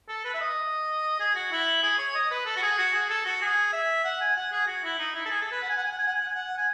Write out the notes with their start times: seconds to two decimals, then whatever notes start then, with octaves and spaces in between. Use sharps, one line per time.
0.08 A4
0.25 B4
0.34 E5
0.41 D#5
1.20 G#4
1.35 F#4
1.52 E4
1.83 G#4
1.98 C#5
2.15 D#5
2.31 B4
2.46 A4
2.57 F#4
2.62 G#4
2.78 F#4
2.93 G#4
3.09 A4
3.25 F#4
3.42 G#4
3.73 E5
4.04 F#5
4.21 G#5
4.36 F#5
4.52 G#4
4.67 F#4
4.84 E4
4.99 D#4
5.15 E4
5.26 A4
5.30 G#4
5.41 A4
5.52 B4
5.62 F#5
5.69 G#5
5.77 F#5
5.84 G#5
5.92 F#5
5.99 G#5
6.06 F#5
6.14 G#5
6.21 F#5
6.28 G#5
6.35 F#5
6.57 G#5